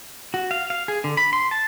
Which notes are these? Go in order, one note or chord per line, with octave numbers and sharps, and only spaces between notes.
F#4
F5
F5
G#4
D3
B5
C6
A5